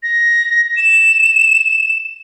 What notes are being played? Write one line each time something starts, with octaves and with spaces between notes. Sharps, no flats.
A#6
E7